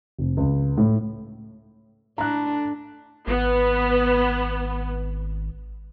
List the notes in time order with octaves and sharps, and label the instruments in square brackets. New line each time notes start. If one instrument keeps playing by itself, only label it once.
[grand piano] F1
C#2
A2
[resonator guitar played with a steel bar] A2 [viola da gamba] D4 [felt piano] A#5 F#6
[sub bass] G#1 [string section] B3